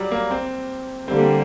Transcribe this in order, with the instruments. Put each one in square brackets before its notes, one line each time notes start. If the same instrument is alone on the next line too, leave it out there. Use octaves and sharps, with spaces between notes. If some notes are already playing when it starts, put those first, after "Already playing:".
Already playing: [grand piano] F#3 G3
A#3
C4
[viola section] D3 G3 A#3 [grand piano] C4